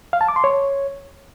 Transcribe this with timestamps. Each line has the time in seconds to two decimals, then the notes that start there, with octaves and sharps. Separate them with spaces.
0.13 F5
0.21 A5
0.28 D6
0.36 C6
0.44 C#5